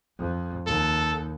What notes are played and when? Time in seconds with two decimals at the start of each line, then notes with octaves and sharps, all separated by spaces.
0.18 F2
0.66 D#2 A4